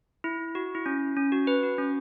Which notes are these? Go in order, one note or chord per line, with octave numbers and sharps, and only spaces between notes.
E4
F#4
E4
C#4
C#4
F#4
B4
F#4
C#4